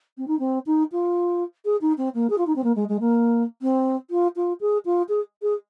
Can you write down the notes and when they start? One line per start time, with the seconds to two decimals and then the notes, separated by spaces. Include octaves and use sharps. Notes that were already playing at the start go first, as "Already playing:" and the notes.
0.18 C4
0.28 D#4
0.39 C4
0.66 D#4
0.92 F4
1.65 G#4
1.81 D#4
1.98 C4
2.14 A#3
2.30 G#4
2.38 F4
2.47 D#4
2.56 C4
2.64 A#3
2.76 G#3
2.89 G#3
3.00 A#3
3.62 C4
4.10 F4
4.36 F4
4.61 G#4
4.85 F4
5.09 G#4
5.42 G#4